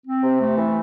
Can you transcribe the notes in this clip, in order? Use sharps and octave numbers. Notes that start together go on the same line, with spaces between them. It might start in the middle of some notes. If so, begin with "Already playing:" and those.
C4
C3
A3
E3